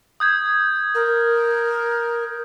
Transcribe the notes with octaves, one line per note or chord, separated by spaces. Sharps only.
D#6 G6 G#6
A#4